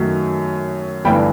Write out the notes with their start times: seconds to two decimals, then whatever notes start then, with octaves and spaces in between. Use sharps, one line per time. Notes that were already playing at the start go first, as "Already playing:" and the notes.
Already playing: F#2 D#3 F#3 A3
1.05 G1 G2 E3 A3 G5 B5